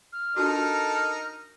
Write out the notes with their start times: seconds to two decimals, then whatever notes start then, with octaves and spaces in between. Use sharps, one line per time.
0.13 F6
0.37 D4 D#4 F4 F#4 A4 A#4